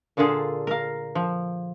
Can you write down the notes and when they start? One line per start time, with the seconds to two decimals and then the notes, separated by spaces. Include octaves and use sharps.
0.17 A#2 D3 D4 F4 G#4 A4
0.67 A#4 F5
1.15 F3